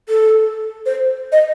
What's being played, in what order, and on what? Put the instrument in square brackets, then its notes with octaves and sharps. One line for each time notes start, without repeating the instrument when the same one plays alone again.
[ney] A4
C5
D#5